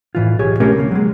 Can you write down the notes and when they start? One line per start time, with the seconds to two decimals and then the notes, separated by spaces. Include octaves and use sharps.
0.15 A2 E3 F4
0.39 B1 G4 G#4 C#5
0.60 B2 A3 C4 C#4 G4 A#4
0.78 C#3 A#3
0.91 F#3 G#3